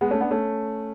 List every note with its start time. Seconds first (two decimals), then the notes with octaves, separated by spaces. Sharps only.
0.01 G#3 B3
0.11 A3 C#4
0.21 B3 D4
0.31 A3 C#4